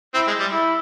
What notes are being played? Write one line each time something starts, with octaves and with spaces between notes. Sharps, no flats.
C4 E4
G#3
G3
E4